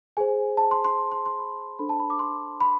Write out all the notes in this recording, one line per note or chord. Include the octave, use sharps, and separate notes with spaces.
G#4 C5 G#5
A5
C6
C6
C6
C6
B5
D4 A4 C5 B5
A5
B5
D6
C6
B5